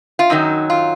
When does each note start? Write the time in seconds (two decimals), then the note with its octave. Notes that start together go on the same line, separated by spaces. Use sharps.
0.19 F4
0.30 F#2 D#3 F#3 D#4
0.70 F4